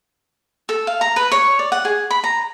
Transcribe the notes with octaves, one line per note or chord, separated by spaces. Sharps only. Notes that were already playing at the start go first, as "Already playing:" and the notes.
A4
F5
A#5
B4
C#5
D5
F#5
G#4
B5
A#5